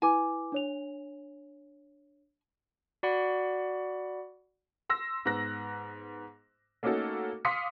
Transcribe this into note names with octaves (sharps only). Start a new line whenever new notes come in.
E4 B4 G#5 D6
D4 C#5 F7
F#4 D5 F#5 B5
C6 E6 A#6
G#2 B3 F#6 A#6
A3 A#3 C#4 D#4 F#4 A4
F5 C6 D6 D#6 B6 C#7